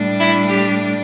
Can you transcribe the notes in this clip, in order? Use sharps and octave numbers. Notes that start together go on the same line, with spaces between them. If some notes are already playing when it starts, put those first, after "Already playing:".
Already playing: A2 G3 D4
E4
G4